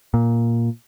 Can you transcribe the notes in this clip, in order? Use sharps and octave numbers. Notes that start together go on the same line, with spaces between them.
A#2